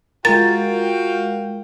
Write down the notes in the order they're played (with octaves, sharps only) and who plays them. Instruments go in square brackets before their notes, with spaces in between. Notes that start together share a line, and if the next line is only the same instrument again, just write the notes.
[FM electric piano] G#3 F4 A#4 [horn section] F#4 F5 G5 [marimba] A6